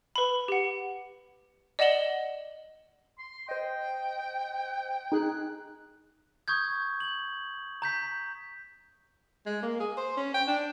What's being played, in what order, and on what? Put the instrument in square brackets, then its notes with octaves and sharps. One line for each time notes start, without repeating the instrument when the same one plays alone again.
[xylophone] B4 B5
G4 F#5
D5 D#5 F#5 E7 F#7 G7
[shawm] C6
[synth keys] C5 D#5 [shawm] G5
[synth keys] D#4 G#4 F#6
[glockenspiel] C#6 D#6 G6 G#6
F#7
A#5 G6 B6
[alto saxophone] G#3
A#3
G#4
C5
C#4
G5
D4